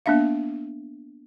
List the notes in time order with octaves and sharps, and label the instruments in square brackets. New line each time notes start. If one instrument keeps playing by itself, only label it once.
[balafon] A#3 B3 D4 E5 F5